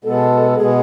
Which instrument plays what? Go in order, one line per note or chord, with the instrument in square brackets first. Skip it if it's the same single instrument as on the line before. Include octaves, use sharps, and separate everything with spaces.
[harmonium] B2 G#3 B3 [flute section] A4
[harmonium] B2 G#3 B3 [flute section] G#4